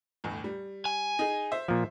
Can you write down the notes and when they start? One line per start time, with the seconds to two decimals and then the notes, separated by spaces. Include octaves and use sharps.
0.24 G1 E2 A2
0.44 G3
0.85 G#5
1.19 D#4 G#4
1.52 C5 E5
1.68 A#2 F3